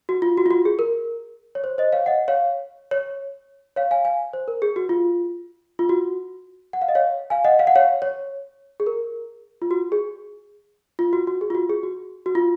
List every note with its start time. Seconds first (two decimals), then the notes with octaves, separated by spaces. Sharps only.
0.09 F#4
0.22 F4
0.37 F#4
0.46 F4
0.51 F#4
0.65 G#4
0.79 A#4
1.55 C#5
1.64 C5
1.78 C5 D#5
1.92 C#5 F5
2.06 D#5 F#5
2.28 C#5 F5
2.91 C#5
3.76 C#5 F5
3.91 F5 G#5
4.05 F5 G#5
4.33 C5
4.48 A#4
4.62 G#4
4.76 F#4
4.89 F4
5.79 F4
5.89 F#4
6.73 F#5
6.82 F5
6.88 D#5
6.95 C#5 F5
7.30 F5 G#5
7.45 D#5 F#5
7.59 F5
7.67 F#5
7.75 C#5 F5
8.02 C#5
8.80 G#4
8.87 A#4
9.62 F4
9.71 F#4
9.92 G#4
10.99 F4
11.13 F#4
11.27 F#4
11.41 G#4
11.50 F4
11.55 F#4
11.70 G#4
11.83 F#4
12.26 F#4
12.35 F4